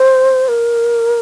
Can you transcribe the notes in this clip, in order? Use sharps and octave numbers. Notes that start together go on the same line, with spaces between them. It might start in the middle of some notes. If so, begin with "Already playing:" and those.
Already playing: C5
A#4